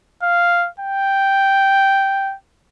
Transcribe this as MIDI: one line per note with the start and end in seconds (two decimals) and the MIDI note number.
0.22 0.68 77
0.80 2.35 79